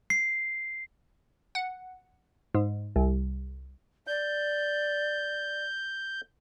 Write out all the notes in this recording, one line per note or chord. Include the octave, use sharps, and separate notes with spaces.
C7
F#5
G#2
C2
D5 G6